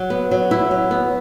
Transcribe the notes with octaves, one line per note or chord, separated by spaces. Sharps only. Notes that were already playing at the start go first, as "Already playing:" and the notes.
Already playing: F#3
B3
F#3
E4
F#3
B3